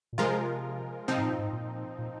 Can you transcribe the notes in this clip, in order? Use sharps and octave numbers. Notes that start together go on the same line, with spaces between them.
A#2
C3 F3 G#3 F4 A#4
C3 F3 C4 D#4
G#2
A#2
G#2
A#2
A#2